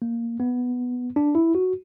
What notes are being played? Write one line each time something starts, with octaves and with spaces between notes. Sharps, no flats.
A#3
B3
D4
E4
F#4